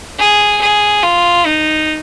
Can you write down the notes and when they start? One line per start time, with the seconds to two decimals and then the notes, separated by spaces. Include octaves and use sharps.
0.18 G#4
0.61 G#4
1.03 F4
1.46 D#4